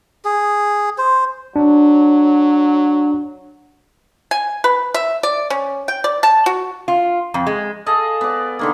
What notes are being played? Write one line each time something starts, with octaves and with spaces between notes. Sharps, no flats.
G#4
C5
F#3 D4
G#5
B4
E5
D5
C#4
G5
D5
A5
F#4
F4
F2
G#3
G#4 A4 D#5 F5
B3 D5
D3 D#3 A#3